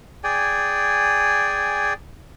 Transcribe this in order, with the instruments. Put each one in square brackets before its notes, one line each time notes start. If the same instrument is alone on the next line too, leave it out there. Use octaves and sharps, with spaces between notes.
[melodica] G#4 D5 G5 G#5